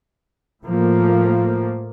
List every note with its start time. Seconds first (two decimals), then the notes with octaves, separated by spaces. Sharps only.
0.64 A2 F3 A#3